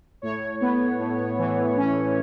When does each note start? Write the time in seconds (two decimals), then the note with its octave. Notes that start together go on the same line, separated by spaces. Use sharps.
0.22 A2 C#5
0.61 B3
0.99 A2
1.38 E3
1.77 C#4